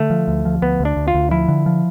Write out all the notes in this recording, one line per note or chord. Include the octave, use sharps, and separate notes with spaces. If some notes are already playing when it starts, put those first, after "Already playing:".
Already playing: D3 A3
F3
D2
F3
D2 B3
D2
D4
D2
F4
D2
F3 E4
D3
F3